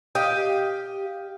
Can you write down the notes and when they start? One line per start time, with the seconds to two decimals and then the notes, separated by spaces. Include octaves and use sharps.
0.15 G4 D#5 F5